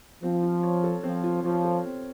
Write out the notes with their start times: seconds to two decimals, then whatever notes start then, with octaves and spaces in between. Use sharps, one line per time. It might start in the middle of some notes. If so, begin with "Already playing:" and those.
0.23 F3 C4
0.43 F4
0.63 C#5
0.84 A4
1.03 F3 C4
1.24 F4
1.44 F3 C#5
1.64 A4
1.85 C4